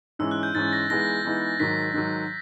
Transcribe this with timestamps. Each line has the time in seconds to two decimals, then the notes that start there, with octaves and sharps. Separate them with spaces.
0.19 G#2 E3 G#3 C#4 E6
0.31 F#6
0.43 G6
0.55 G#2 E3 G#3 C#4 A6
0.73 A#6
0.90 E3 G#3 B3 D#4 G#4 A#6
1.25 E3 G#3 B3 D#4 G#4
1.60 G#2 D#3 F#3 B6
1.94 G#2 D#3 F#3